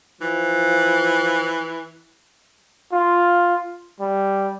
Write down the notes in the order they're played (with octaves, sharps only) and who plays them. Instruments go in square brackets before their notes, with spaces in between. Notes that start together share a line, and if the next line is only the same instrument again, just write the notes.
[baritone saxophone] E3 [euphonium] F3
[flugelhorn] F4
G3